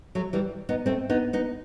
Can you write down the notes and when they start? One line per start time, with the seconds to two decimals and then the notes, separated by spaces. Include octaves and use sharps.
0.15 F#3 A3
0.33 E3 G3
0.69 B3 D#4
0.86 A3 C4
1.09 B3 D#4
1.33 B3 D#4